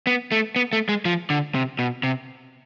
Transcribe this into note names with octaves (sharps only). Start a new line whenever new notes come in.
B3
A3
B3
A3
G#3
F3
D3
C3
B2
C3